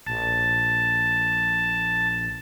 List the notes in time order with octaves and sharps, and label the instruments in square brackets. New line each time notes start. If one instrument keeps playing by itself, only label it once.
[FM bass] A#1 [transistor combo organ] A5